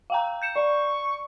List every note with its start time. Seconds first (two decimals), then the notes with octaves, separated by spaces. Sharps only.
0.10 F5 G5 A#5
0.42 G6 C#7 E7
0.56 D5 C#6